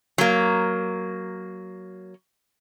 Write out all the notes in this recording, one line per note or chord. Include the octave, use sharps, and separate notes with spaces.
F#3 A#3